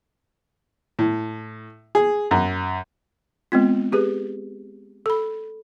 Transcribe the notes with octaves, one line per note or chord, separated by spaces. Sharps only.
A2
G#4
F#2
G#3 B3 C4 F4
G4 G#4 B4
A4 B5